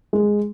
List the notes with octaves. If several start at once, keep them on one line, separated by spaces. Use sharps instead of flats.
G#3